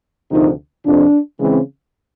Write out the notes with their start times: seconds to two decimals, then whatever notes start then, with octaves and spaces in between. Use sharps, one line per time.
0.31 D2 C3 D#3 F3 D#4
0.85 F2 C3 F3 D4
1.39 C#3 E3 G#3 C4